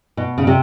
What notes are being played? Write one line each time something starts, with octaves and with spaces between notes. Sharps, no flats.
B2
C#3
C3